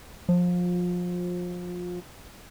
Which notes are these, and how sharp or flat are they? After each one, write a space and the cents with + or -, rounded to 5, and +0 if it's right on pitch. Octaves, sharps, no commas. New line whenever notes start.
F3 +25